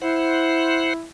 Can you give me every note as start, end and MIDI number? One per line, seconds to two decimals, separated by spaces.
0.02 1.07 64
0.02 0.93 72
0.02 0.93 78